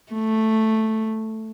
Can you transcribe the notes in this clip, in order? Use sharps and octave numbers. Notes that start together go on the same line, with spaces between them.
A3